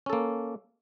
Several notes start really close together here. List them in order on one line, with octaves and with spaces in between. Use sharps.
C#4 A4 A#3